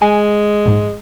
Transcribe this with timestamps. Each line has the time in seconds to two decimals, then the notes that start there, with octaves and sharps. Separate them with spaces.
0.02 G#3 G#5
0.65 A#1 G#2